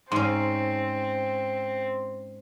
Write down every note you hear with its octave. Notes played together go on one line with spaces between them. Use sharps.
G#2 C4 C#4 C6